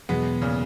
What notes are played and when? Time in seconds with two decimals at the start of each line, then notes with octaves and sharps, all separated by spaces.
0.09 E2 B2 F#3 G#3 B3
0.42 A#2 C#3